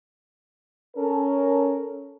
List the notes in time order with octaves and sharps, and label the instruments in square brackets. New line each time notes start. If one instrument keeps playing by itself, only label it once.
[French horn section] C#4 A4 A#4